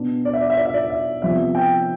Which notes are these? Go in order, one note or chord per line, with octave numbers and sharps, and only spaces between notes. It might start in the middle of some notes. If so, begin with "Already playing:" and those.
Already playing: B2 B3 D4
D5
E5
D5
E5
D5
E5
D5
E5
C3 F3 B3 E5
G5